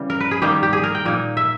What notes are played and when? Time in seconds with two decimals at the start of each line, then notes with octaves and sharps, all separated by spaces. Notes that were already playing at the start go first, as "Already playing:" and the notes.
Already playing: C#3 E3 G3
0.10 A#4
0.21 B4
0.31 G#4
0.42 D#3 G3 A#3 D#4 G4
0.63 G4
0.73 G#4
0.84 A#4
0.95 G5
1.06 A#2 A#3 D#4
1.37 E5